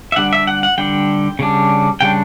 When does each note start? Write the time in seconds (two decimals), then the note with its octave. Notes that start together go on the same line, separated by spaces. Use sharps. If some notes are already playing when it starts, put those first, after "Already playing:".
0.12 E5
0.16 D3 G3 D4 F#5
0.33 E5
0.47 F#5
0.63 F#5
0.78 D3 G3 D4 G5
1.39 C#3 G3 D4
2.01 C#3 G3 D4 G5